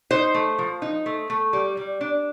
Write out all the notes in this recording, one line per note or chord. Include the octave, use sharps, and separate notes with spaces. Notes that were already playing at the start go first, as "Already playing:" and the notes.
D#4 C5
A3
F3
D#4
A3
A3
G3
G3
D4